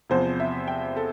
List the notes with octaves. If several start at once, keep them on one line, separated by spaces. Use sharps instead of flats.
E2 C3 F3 C5
E5
G5
A4